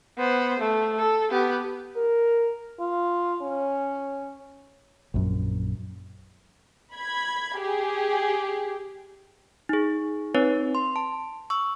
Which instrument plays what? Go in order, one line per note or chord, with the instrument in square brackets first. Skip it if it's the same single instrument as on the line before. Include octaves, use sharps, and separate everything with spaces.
[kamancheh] B3 C5
A3
A4
B3 G4
[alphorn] A#4
F4
C#4
[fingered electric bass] A#1 F#2
[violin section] B5 G#6
G4 G#4
[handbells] D#4 G#4
C4 D#4 B4 C#5
C6
A5
C#6 E6